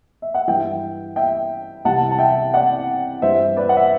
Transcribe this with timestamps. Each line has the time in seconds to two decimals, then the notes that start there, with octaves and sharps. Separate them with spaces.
0.22 E5
0.35 F#5
0.48 G2 E3 E5 G5
1.16 E5 G5
1.85 C2 C3 E3 F#5 A5
2.11 A5
2.19 E5 G5
2.54 D5 F#5
3.22 G2 E3 C5 E5
3.57 B4 D5
3.69 F#5
3.77 E5